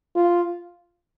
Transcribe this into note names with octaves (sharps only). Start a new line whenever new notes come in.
F4